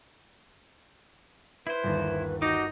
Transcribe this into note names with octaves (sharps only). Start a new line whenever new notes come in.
E4 B4 C5
G1 D#2
D#4 F#4 D6 G6 A#6 D7